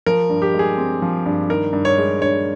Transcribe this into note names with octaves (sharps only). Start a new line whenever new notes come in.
F3 A#4
G2
G4
G#3
G#4
C4
F3
G2
D#3 A#4
G2
C#5
G#3
G2 C#5